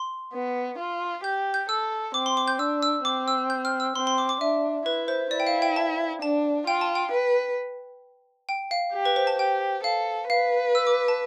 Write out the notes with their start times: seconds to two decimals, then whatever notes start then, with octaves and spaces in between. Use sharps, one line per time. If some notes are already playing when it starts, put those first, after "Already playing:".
Already playing: C6
0.33 B3
0.79 F4
1.24 G4 G6
1.54 G6
1.69 A4 E6
2.14 C4 D6
2.26 C6
2.37 D6
2.48 G6
2.59 D4 E6
2.82 E6
3.05 C4 D6
3.28 E6
3.50 G6
3.65 F6
3.80 E6
3.96 C4 C6
4.07 C6
4.18 D6
4.29 D6
4.41 D4 E5
4.86 E4 B4
5.08 C5
5.31 E4 D5
5.40 G5
5.47 F5
5.62 G5
5.76 A5
6.22 D4 A5
6.67 F4 G5
6.81 A5
6.95 G5
7.12 B4
8.49 G5
8.71 F5
8.93 G4
9.05 B4
9.16 C5
9.27 A5
9.39 G4 G5
9.84 A4 F5
10.29 B4 F5
10.75 E6
10.87 D6
11.08 A5